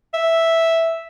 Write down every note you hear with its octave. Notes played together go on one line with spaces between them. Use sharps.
E5